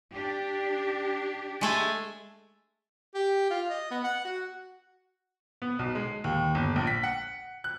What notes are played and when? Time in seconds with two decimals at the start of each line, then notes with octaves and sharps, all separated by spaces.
0.13 D4 G4
1.61 G#3 A3 G#5
3.15 G4
3.50 F4
3.70 D#5
3.91 B3
4.04 F#5
4.25 F#4
5.62 B3
5.79 B1
5.95 G#3
6.24 D#2
6.55 G1
6.76 A#1
6.87 B6
7.03 F#5
7.64 F#6